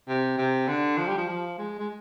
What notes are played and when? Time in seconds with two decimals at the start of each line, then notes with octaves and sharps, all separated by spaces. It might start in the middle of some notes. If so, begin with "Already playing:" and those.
0.08 C3
0.38 C3
0.68 D3
0.98 F3
1.08 G3
1.18 F3
1.28 F3
1.58 G#3
1.79 G#3